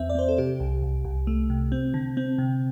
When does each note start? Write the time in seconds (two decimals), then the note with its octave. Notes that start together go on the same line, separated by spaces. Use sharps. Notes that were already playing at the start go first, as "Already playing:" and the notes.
Already playing: E2 C4 E5
0.09 D5
0.15 C4 C5
0.29 A4
0.38 C3 G4
0.60 C2
0.83 C2
1.05 C2
1.27 A3
1.50 C3
1.72 C4
1.94 D3
2.17 C4
2.38 C3